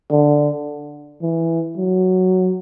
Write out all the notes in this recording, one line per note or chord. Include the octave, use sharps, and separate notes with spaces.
D3
E3
F#3